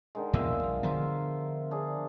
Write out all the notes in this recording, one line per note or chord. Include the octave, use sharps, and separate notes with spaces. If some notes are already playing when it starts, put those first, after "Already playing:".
D3 D#3 G#3
E2 B2 A#3 F4 E5
B1
D3 F3 B3 A#4 C5 E5
D4 G#4